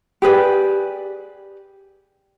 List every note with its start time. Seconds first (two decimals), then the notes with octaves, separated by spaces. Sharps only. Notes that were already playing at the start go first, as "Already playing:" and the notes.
0.22 G4 G#4 B4 D5